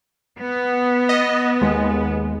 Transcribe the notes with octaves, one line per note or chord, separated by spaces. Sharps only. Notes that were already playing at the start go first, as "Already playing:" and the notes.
B3
D#5
D#2 G#3